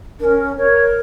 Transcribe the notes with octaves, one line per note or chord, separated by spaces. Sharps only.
C#4 D4 A#4
A#4 C#5